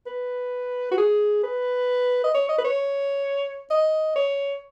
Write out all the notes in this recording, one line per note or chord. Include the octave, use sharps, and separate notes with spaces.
B4
F#4
G#4
B4
D#5
C#5
D#5
B4
C#5
D#5
C#5